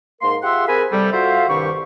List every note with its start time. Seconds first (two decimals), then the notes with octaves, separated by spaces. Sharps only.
0.22 G#2 A#3 A#4 C6
0.43 F4 G4 G#4 E5 F#5 C6
0.68 C4 G#4 A#4 G#5 B5
0.92 C3 G3 A4
1.13 F4 F#4 A4 C5 E5 F5
1.49 C2 G2 D#3 G3 C#6